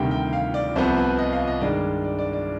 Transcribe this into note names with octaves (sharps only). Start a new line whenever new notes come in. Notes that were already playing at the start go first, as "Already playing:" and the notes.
Already playing: D2 C3 D#3 G3 G5
G5
F5
D5
C2 C3 F3 B3 C5
B4
D#5
F5
D#5
G2 D#3 G#3 D5
D5
D5
D5